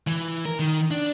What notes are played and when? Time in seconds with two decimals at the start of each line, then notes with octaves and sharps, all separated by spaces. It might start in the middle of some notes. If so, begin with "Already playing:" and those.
0.07 E3
0.45 A#4
0.60 D#3
0.91 D4